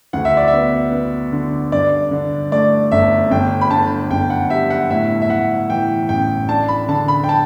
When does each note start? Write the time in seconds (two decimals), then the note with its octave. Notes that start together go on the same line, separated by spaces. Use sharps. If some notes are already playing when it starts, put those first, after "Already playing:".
0.13 D2 F#5
0.25 E5
0.37 D5
0.48 E5
0.53 B3
0.92 B3
1.32 D3
1.72 G2 D5
2.11 D3
2.52 A3 D5
2.91 G1 E5
3.31 G1 G5
3.61 B5
3.71 D3 A5
4.11 G1 G5
4.30 F#5
4.50 G3 E5
4.70 F#5
4.90 A2 E5
5.22 E5
5.29 A2 F#5
5.70 E3 G5
6.09 A1 G5
6.49 D4 A5
6.68 B5
6.88 D3 A5
7.08 B5
7.24 G5
7.29 A5